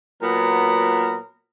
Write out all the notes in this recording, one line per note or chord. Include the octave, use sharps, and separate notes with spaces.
A#2 F#3 B3 A#4